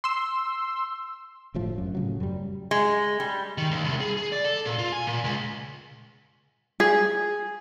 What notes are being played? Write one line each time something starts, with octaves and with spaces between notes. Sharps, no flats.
C6 E6
G1 A2 F3
F#2
A2 C#3 F#3
F#2 G3
G#3
G3
D#3
D#2
C2
G#4
G#4
D5
A4
A#2
F4
G#5
A#2
C#2
G#4